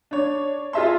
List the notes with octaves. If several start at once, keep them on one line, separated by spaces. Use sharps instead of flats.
D4 C#5
F4 G#4 D#5 E5 A5 C6